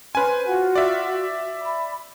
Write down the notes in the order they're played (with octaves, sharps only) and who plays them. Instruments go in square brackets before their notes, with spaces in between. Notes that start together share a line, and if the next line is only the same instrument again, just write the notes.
[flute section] C#4 C6 F6 [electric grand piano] B4 G#5
[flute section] C5
F4 F#4 F#5
[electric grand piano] D5 E5
[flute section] B5